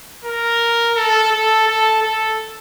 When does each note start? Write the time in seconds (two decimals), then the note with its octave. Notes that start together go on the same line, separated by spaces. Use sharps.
0.25 A#4
0.96 A4
1.31 A4
1.67 A4
2.02 A4